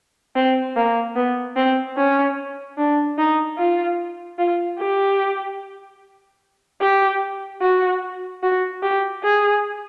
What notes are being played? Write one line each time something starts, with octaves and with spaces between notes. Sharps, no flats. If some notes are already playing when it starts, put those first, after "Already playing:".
C4
A#3
B3
C4
C#4
D4
D#4
F4
F4
G4
G4
F#4
F#4
G4
G#4